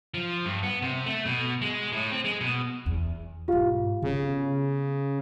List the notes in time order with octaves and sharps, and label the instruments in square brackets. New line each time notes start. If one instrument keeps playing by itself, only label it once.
[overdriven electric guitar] F3
G2
B3
C3
A3
B2
G#3
A2
C4
G#3
B2
[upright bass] E2
[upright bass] B1 G#2 [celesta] F4 G4 F5
[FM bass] C#3 [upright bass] B3